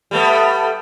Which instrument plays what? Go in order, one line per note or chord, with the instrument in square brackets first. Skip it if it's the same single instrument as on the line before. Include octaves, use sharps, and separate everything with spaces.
[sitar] G3 A3 B3